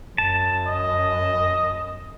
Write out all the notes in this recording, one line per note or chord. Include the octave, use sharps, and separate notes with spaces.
F#2 A5
D#5